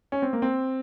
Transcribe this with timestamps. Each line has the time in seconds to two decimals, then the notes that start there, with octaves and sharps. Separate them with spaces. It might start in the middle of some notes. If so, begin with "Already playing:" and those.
0.12 C#4
0.22 C4
0.33 A#3
0.42 C4